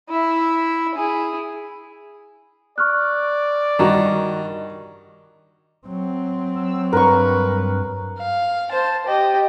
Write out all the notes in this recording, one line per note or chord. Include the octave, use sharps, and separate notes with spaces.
E4 E5
E4 G#4
D5 C#6 F6 F#6
G2 D#3 F#4 A#5
F#3 C4
E6
G2 A#4 B4 C#6
F5
C5 A5
G4 D#5